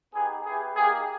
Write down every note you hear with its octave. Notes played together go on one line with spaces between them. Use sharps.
B3 D#4 G4 G#4
B3 E4 G4 G#4
A#3 D#4 G4 G#4